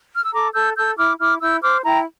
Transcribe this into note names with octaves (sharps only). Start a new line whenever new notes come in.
F6
E6
A4 A#5 D6
A4 E6 G6
A4 E6 G6
E4 D6 F6
E4 D6 F6
E4 E6 G6
C5 D6 F6
E4 G5 A#5